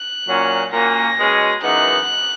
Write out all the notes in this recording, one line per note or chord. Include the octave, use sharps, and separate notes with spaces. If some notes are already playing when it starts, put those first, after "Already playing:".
Already playing: F#6
A#2 F#3 C#4
A#2 A#3 C#4 F#4 A#6
B2 G#3 C#4
F#2 E3 G#3 B3 D#4 F#6